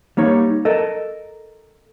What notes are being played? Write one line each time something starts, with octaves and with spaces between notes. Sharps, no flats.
G3 A#3 D#4 C#5
A4 A#4 D#5